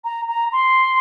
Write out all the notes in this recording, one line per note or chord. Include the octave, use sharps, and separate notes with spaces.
A#5
A#5
C6